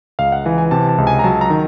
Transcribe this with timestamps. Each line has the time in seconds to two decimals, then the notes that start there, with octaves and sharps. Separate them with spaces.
0.19 C#2 F5
0.32 F#5
0.46 E3 G#5
0.58 G#5
0.71 C3 A5
0.89 A5
0.98 C#2
1.07 G#5
1.19 A#5
1.24 F#3 A5
1.41 A#5
1.50 D#3